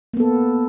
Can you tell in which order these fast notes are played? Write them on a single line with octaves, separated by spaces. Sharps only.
A#3 B3 A4